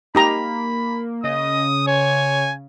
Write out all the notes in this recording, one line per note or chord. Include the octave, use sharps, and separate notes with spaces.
A#3 D#4 G4 A#5 B5
C#3 D#5 D#6
C#5 G#5